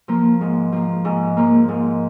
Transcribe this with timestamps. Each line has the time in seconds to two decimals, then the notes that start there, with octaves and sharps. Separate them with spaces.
0.08 F3 A#3
0.41 G#2
0.72 F3 A#3
1.05 G#2
1.37 F3 A#3
1.68 G#2